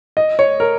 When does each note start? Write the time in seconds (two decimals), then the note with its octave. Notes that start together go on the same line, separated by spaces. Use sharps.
0.17 D#5
0.39 C#5
0.60 A#4